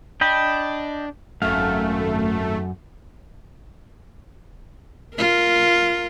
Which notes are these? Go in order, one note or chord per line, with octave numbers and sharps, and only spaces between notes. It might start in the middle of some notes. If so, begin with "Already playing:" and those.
D4 D#5 G5 B5
G#1 F#2 A3 F5
F4 A#4